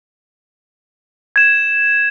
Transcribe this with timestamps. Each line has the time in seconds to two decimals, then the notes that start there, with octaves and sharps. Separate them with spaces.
1.36 G#6 E7